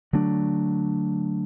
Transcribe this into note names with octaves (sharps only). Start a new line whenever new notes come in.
D3 F#3 A3 D4